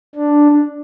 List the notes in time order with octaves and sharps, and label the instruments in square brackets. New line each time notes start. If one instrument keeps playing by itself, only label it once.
[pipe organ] D4